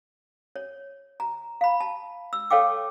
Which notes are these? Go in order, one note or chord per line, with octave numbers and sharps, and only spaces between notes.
C#5
A#5
F5 B5
A5
E6
A4 C#5 F5 G5 D6